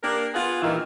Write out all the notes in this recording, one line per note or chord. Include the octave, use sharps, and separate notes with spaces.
A#3 D4 G4 A#4
B3 F4 G#4 F#5
G2 A#2 D#3 E3 E4 F4